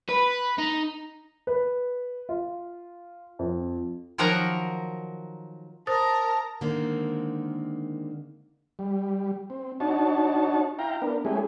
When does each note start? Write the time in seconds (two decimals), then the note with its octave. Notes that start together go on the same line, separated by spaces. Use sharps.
0.09 B4
0.58 D#4
1.47 B4
2.29 F4
3.39 F2
4.18 D#3 F3 F#3 A#4 F#5 A#5
5.87 A#4 C5 A5 A#5 D#6 A6
6.61 D3 D#3 G#3 A#3 C4
8.79 G3
9.50 C4
9.80 D4 D#4 F#4 C#5 A5
10.79 E4 F5 G5 A#5
11.02 B3 D4 A#4
11.25 G#3 A3 C#4 E4 G4 G#4